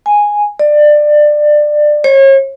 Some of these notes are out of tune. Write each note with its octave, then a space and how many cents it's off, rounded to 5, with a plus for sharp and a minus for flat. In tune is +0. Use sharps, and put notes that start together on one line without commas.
G#5 -5
D5 +20
C#5 -35